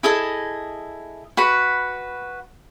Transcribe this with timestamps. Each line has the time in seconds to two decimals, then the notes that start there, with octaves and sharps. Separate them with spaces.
0.03 E4 G#4 A4 D#5
1.37 F#4 B4 B5